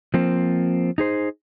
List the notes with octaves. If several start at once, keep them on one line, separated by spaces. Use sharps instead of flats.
F3 A#3 C4
D#4 G#4 C5